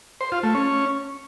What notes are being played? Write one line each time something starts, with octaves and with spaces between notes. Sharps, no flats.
C5
F4
A3
C#4